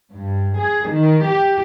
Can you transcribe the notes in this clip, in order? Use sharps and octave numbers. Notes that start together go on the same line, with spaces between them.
G2
G#4
D#3
G4